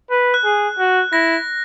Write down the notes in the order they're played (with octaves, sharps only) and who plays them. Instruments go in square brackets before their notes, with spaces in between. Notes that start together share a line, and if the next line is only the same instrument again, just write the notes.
[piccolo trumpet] B4
[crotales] F#6
[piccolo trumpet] G#4
F#4
[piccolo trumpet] E4 [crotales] A#6